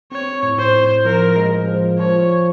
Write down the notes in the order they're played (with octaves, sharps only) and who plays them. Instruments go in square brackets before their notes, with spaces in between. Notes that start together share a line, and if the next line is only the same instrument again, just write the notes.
[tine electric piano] C4 [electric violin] C#5
[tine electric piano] A2
[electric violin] C5
[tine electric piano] A2
[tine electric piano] F3 [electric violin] A#4
[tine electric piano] G#3
F3
[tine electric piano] F3 [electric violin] C#5